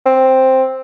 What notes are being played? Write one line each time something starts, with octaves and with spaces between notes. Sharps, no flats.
C4